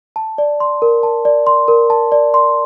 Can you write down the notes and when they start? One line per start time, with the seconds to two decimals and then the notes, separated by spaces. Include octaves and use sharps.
0.16 A5
0.38 D5
0.60 C6
0.82 A#4
1.03 A5
1.25 D5
1.47 C6
1.68 A#4
1.90 A5
2.12 D5
2.34 C6